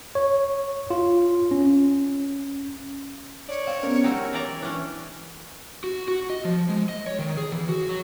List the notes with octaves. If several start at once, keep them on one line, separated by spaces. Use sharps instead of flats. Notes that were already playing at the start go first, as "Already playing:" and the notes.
C#5
F4
C#4
C#5 D5
C4 F5
B3 C#4 A#4
F#3 G#3 D#4 G5 E6
E3 D5 A#5
E3 C#4 D4
F#4
F#4
D#5
F3
G#3
D#5
C#5
D#3
G#4
E3
F#4
F#3